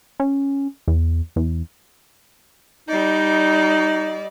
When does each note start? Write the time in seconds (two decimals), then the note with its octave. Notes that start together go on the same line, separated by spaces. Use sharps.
0.20 C#4
0.88 E2
1.36 E2
2.88 G3 D#4 D5 D#5